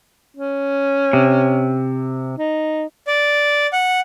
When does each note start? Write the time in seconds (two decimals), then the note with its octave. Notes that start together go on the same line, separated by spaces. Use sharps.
0.37 C#4
1.13 C3
2.36 D#4
3.07 D5
3.73 F#5